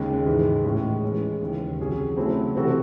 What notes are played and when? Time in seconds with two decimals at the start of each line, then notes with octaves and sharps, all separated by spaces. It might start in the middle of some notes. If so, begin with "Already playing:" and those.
Already playing: D#2 C#3 G#3
0.26 G#2 E3 G#3
0.65 A2 G#3 C#4
1.03 E3 G#3 C#4
1.41 D#2 C#3 E3
1.78 C2 C3 F#3 C#4 G#4
2.16 C#3 F#3 A3 C4 E4
2.55 C3 E3 C4 F#4 A4